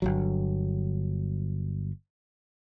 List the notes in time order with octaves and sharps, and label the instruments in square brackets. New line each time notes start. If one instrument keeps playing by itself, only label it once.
[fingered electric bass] G1 C#2 F#3